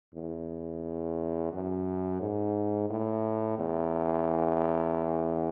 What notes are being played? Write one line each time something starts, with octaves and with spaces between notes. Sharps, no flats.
E2
F#2
G#2
A2
E2